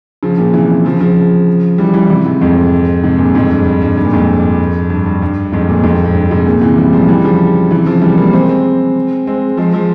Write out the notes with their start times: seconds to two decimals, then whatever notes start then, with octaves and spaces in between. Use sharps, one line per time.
0.23 C#3 F3
0.38 A#2 C#3
0.54 C3 E3
0.85 C#3 F3
1.00 C#3 F3
1.78 E3 G3
1.94 E3 G3
2.10 C3 E3
2.25 G#2 C3
2.41 F2 G#2
3.04 G#2 C3
3.18 G2 A#2
3.34 F2 G#2
3.51 G2
3.66 G2
3.82 G2
3.97 G2
4.05 A#2
4.13 F2 G#2
4.90 G2
5.06 G2
5.22 G2
5.52 F2 G#2
5.68 G2 A#2
5.83 F2 G#2
6.05 G#2
6.15 G2
6.31 G#2 C3
6.46 A#2 C#3
6.61 C3 E3
6.77 E3 G3
6.92 F3 G#3
7.09 E3 G3
7.24 C#3 F3
7.71 C3 E3
7.86 C#3 F3
8.02 E3 G3
8.18 G3 A#3
8.33 G#3 C4
8.49 G#3 C4
9.27 G#3 C4
9.57 F3 G#3
9.73 F3 G#3